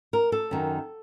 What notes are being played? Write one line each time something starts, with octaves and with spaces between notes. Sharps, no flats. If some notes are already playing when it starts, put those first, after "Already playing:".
A#4
A4
F#2 D#3